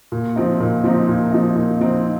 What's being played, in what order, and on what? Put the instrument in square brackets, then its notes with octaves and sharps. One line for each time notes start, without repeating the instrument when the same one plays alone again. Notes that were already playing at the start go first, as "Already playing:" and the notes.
[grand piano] A#2
F3 C4 D#4
A#2
F3 C4 D#4
A#2
F3 C4 D#4
A#2
F3 C4 D#4